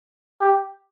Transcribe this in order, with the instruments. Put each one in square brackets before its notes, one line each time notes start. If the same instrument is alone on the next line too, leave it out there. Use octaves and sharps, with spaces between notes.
[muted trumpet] G4